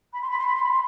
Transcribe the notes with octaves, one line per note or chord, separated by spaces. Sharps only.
B5
C6
B5
C6
B5
C6
B5
C6